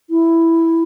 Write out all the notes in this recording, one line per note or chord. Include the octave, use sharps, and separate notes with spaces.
E4